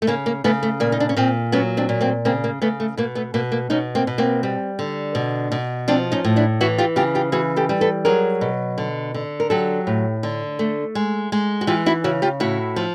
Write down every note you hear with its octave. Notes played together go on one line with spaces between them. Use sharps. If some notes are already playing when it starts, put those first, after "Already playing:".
A3
C#3 A#3
A#3
C#3 A3 B3
A3
A#2 A#3
D#4
D4
C#4
A#2 A#3 C4
F#3 B3 C#4
C4 D4
A#2
A#3 C4
C#3 A#3 C4
A#3
C#3 A3 B3
A3
B2 A#3
A3 B3
B2 A#3
A#3
B2 C#4 D#4
A#3 C4
B2
A#3 C4
G3
D3
B2
B2
F3 C4 D4
C#4 D#4
A2
D4 E4
E3 E4 F#4
F4 G4
C#3 F4 G4
F4 G4
E3 F#4 G#4
G4 A4
G3
A4 B4
F#3 G#4 A#4
B2
D3
D3
A#4
F#3 G4 A4
A2
D3
A3
G#3
G#3
F#4
E3 F4 G4
E4 F#4
C#3 E4 F#4
F4 G4
A2 E4 F#4
F3